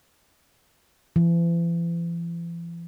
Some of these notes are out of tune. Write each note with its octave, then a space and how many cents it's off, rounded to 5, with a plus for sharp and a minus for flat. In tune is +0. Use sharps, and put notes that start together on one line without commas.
E3 +45